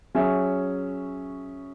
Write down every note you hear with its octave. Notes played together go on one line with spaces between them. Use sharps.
F#3 C#4 G#4 C#5 E5